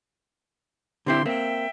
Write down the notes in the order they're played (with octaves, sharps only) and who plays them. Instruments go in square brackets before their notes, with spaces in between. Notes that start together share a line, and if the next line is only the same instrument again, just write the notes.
[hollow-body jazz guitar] D3 C4 E4 [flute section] G4 C6
[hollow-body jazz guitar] A#3 C4 [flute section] E5 G5